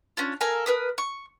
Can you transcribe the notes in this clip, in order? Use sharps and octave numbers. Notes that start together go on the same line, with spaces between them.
C#4 D4 F4
A4 A#4 F5 G#5
A#4 B4 D#6
C#6